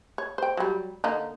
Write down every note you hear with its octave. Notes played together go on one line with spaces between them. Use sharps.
C#5
C5 G5
F#3 G3
D3 A#3 D#4